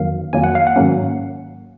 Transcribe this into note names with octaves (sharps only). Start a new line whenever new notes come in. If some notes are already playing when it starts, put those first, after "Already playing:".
Already playing: F2 D#3 F#3 A#3 F5
F2 D#3 F#3 A#3 G#5
F#5
F5
F#5
G#2 D#3 F#3 A#3 C#4